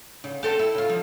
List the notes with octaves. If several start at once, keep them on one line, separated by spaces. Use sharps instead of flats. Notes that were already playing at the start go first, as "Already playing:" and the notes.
C#3
G4 A4 C5
E4
C#3 F4
F3